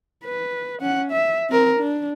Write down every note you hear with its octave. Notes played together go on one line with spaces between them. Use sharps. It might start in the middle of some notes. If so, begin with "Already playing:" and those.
B4
C#4 F#5
E5
C4 A#4
D4